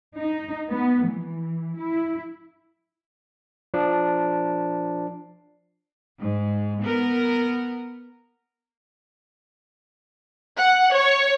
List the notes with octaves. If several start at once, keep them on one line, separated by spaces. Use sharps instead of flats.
D#4
B3
E3
E4
F3 D4
G#2
B3 A#4
F#5
C#5